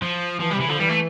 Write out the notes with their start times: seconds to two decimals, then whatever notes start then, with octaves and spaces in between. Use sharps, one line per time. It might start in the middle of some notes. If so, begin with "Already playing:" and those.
0.03 F3
0.40 E3 F3
0.51 C3 G3
0.60 E3
0.66 D3 F3
0.79 E3 G3
0.89 A3